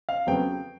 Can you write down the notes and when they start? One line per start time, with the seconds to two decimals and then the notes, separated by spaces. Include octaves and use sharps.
0.09 F5
0.27 F2 C#3 F#3 B3 G5